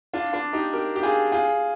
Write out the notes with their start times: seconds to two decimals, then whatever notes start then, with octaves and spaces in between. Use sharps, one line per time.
0.13 D4 F4
0.33 D4 F4
0.53 D#4 G4
0.73 G4 A#4
0.96 G4
1.03 F4 G#4
1.32 F4 G#4